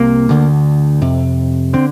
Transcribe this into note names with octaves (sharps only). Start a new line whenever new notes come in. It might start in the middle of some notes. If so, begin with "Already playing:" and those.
Already playing: C2 C3 A#3
D2 D3
F2 C3
D3 C4